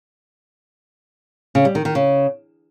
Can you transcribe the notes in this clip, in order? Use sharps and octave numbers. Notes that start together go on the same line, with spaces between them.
C#3
G3
D#3
D#3
C#3